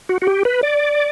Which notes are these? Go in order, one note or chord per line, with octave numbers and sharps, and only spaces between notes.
F#4
F#4
G4
B4
D5